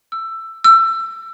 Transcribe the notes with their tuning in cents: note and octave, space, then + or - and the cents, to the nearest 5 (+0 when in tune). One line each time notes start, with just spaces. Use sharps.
E6 +15
E6 +25